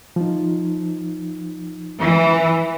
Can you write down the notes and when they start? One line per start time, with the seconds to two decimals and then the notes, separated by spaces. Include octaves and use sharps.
0.16 F3 D#4
2.00 E3